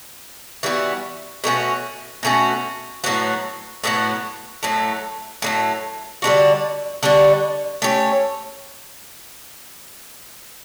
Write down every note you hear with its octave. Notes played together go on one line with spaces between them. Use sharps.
E3 G3 B3 F#4
B2 A3 C#4 F#4
B2 A3 C#4 F#4
A2 F#3 B3 F#4
A2 F#3 B3 F#4
A2 F#3 A3
A2 F#3 A3
D3 G3 D4 F#4
D3 G3 D4 F#4
A3 C#4 G4 C#5